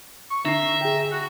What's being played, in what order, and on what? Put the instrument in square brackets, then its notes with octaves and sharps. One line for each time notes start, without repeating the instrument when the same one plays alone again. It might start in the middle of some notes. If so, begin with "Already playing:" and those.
[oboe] C#6
[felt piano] D3 C7 [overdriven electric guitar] E5 [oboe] A#5
[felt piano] G#4 G5
[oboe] F#4